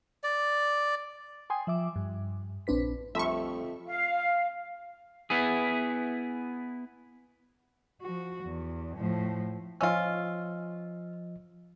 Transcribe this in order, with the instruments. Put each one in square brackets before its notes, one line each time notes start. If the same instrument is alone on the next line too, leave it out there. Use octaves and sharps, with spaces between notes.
[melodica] D5
[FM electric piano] G5 G#5 C6 D#6
F3 E5 D6
G2
A#1 C4 D4 B4 B6
[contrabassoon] F2 [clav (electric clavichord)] F3 G3 A3 [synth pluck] E5 C#6
[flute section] F5
[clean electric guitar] B3 E4 G#4
[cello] F3 F#4
E2
A2 F3
[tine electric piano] F3 D#5 E6 [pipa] C#4 F4